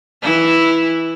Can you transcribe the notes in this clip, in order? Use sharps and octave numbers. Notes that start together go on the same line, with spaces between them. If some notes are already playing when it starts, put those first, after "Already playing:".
E3 E4